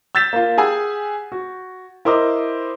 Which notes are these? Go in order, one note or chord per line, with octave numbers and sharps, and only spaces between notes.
E6 G6 A6 B6 E7
A#3 F4
G4 G#4 F#5 G#5 E6
F#4
E4 A#4 C5 D#5 D6 D#6